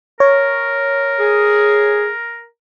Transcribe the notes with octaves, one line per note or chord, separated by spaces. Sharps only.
A#4 C#5
G#4